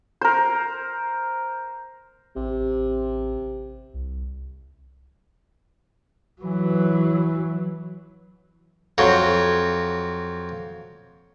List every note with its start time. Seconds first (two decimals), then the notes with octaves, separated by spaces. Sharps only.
0.21 A#4 C5
2.36 A1 C3
3.94 C2
6.42 E3 F#3
8.98 F2 F#3